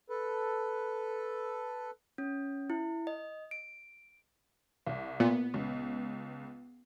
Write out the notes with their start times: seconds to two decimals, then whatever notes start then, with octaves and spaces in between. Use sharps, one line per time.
0.10 A4 B4
2.18 C#4
2.70 E4
3.07 D#5
3.51 D7
4.86 C2
5.20 A#2 B3
5.54 C#2